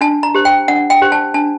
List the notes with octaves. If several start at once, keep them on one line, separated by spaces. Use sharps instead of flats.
D4 A5
A#5
G4 C5
G5
D4 F#5
G5
G4 C5
A5
D4 A5